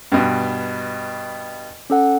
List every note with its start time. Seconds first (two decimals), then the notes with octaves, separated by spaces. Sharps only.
0.12 G2 B2
1.90 C#4 A4 F#5